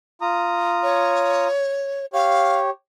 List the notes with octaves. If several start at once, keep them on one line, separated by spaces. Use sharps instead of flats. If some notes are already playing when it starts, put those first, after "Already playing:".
F4 A#5 D#6
C#5
G4 C#5 F5